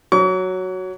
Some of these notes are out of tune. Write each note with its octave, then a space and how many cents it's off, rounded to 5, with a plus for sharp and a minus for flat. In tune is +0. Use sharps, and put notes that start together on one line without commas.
F#3 +0 C#6 +45